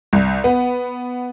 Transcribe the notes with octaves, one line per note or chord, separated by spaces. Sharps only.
C2
B3